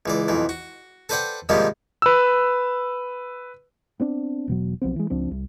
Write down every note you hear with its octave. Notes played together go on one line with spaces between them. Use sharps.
C#2 E3 D5
B1 F2 E3
F#4
A4 B4 C5 D5 F#5 G5
G#2 C3 D#3 F3 G3 A#3
B4 E6
B3 C4 D4
E1 B2 F#3
B1 F3 B3 C4
E3 G#3
C#2 F3 C4 D4
C2